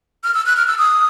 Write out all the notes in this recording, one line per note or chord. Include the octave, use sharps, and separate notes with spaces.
F6
E6
F#6
F6
E6
D#6